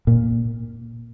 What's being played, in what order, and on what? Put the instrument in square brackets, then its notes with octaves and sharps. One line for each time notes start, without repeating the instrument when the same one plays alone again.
[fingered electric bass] A#2